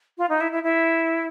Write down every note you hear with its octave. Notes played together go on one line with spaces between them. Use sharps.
F4
D#4
E4
E4
E4